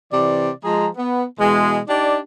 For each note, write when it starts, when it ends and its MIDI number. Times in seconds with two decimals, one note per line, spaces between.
0.13 0.49 48
0.13 0.49 52
0.13 0.49 74
0.64 0.88 53
0.64 0.88 56
0.64 0.88 68
0.64 0.88 82
0.96 1.24 59
1.39 1.78 47
1.39 1.78 52
1.39 1.78 56
1.88 2.18 62
1.88 2.18 63
1.88 2.18 67
1.88 2.18 74